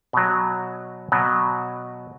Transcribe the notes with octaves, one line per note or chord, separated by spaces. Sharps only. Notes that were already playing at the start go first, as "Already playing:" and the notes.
B2 F#3
B2 F#3